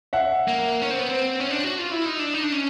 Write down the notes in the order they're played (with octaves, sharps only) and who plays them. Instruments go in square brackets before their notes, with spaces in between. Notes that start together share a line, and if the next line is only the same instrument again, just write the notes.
[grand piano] E5 F#5
[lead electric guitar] A#3
C#4
C4
B3
C4
C#4
D4
F#4
F4
E4
D#4
D4
D#4
D4
C#4